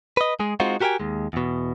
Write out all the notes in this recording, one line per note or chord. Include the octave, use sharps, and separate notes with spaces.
B4 D#5
G#3 G#4
G#3 C4 D#4 F4 F#4
F#4 G4 A#4 B4 G5 G#5
D#2 G#3
E2 B2